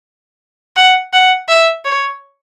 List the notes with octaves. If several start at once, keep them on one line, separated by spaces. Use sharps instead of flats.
F#5
F#5
E5
C#5